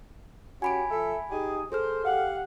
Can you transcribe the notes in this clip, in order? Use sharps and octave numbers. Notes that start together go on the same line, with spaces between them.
C#4 F#4 G4 G#5 B5 D7
F3 A4 E5
D#4 G4 G#4
G#4 A4 C5 F6
G4 F5 F#5